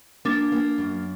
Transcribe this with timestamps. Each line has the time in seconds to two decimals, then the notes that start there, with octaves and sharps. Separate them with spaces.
0.25 A#3 D4
0.52 A#3
0.78 F#2